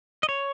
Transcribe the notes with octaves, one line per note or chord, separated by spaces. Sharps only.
D#5
C#5